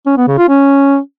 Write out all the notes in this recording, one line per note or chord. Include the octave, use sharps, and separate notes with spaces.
C#4
B3
C#3
F4
C#4